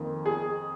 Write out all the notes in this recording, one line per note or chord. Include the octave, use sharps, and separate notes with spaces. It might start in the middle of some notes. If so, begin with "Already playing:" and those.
Already playing: F2 D#3 A#3
G#4